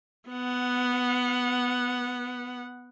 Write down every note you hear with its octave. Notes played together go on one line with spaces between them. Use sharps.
B3 F#5